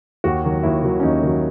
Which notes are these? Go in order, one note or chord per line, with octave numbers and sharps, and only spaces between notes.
D#2 F#4
D#3 F#3
D#2 E4
D#3 F#3
C#4
D#2 D#4
D#3 F#3